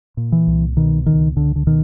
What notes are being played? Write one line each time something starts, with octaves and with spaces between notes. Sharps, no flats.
A#2
E3
C2
B2 D#3
C#2 D#3
C#2 D3
D3
B2 D#3